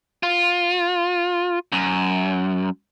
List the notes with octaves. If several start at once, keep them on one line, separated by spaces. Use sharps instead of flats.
F4
F#2